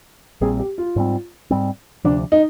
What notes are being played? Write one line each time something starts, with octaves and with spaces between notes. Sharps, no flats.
A#1 A#2 G3 C4 G#4
G4
F4
G#2 G3 C4
G#2 G3 C4
D2 C3 F3 D4
D#4